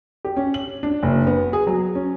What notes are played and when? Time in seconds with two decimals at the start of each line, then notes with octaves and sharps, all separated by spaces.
0.25 G4
0.37 C#4
0.54 F#7
0.83 D4
1.03 F#1
1.27 B3
1.53 G#4
1.67 F#3
1.95 C#4